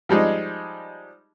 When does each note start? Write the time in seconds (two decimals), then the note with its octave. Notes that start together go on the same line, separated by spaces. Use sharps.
0.09 F3 G3 G#3 D#4